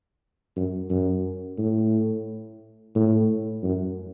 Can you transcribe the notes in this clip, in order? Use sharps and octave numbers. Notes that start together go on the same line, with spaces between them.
F#2
F#2
A2
A2
F#2